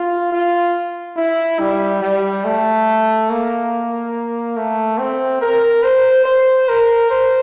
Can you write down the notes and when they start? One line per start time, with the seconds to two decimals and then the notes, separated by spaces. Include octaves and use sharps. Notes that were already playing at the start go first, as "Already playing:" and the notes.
Already playing: F4
0.33 F4
1.17 E4
1.60 G3
2.02 G3
2.45 A3
3.30 A#3
4.57 A3
4.99 C4
5.41 A#4
5.84 C5
6.26 C5
6.69 A#4
7.11 C5